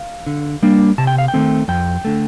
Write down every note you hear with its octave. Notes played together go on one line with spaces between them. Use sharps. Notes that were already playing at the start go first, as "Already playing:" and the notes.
Already playing: F5
D3
G3 A#3 D4
C3 A5
G5
F5
G5
D#3 A3 C4
F2 G5
D3 A3